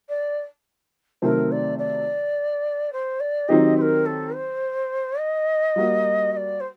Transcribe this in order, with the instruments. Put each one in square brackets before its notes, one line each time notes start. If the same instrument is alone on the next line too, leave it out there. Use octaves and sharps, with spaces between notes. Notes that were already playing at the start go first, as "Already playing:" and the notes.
[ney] D5
[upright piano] C3 D#3 F#3 A3 C4 [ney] A#4
[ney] D5
D5
C5
D5
[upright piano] D#3 F#3 C4 D#4 G4 [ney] D#5
[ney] C5
A#4
A4
C5
D#5
[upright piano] G3 A#3 F#4
[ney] D#5
D5
C5